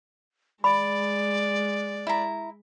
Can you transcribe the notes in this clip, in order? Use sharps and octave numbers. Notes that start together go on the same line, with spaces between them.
G#3 D5 B5
E4 A#5